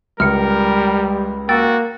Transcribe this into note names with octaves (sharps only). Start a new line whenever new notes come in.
C#2 G3 A#4 F6 C#7
A#3 F#4 G5 E6 A6